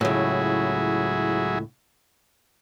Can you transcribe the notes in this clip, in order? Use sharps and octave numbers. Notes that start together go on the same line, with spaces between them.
C#2 A2 F#3 E4 G#4